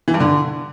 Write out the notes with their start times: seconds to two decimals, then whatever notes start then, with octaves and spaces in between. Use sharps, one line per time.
0.08 E3
0.14 G2
0.20 D3